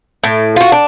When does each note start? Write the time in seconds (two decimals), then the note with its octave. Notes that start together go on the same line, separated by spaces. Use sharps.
0.23 A2
0.56 F4 F#4
0.72 D4